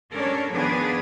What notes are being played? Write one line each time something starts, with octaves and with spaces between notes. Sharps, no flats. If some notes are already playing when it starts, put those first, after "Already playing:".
G3 C#4 D4 A4 A#4 C#5
D#3 F3 B3 D4 G#4 B4